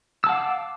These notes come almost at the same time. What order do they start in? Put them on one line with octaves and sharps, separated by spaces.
E6 A5 F#5 F5 D6